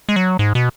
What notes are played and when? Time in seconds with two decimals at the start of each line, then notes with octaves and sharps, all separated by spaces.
0.09 G#3
0.16 F#3
0.39 G#2
0.55 B2